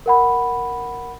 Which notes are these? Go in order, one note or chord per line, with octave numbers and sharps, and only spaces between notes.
A#4 F#5 B5